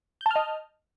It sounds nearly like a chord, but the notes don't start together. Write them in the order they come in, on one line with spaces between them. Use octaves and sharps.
G6 A5 F6 D#5